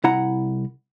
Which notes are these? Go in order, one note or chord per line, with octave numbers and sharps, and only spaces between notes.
C2 E4 F#5 A#5